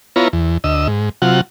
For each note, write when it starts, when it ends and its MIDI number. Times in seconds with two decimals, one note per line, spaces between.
0.16 0.28 59
0.16 0.28 64
0.16 0.28 65
0.16 0.28 73
0.16 0.28 82
0.33 0.57 40
0.64 0.87 38
0.64 0.87 75
0.64 0.87 88
0.88 1.09 44
1.22 1.41 48
1.22 1.41 54
1.22 1.41 65
1.22 1.41 78